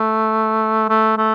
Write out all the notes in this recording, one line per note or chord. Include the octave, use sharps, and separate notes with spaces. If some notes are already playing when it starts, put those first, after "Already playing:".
Already playing: A3
A3
A3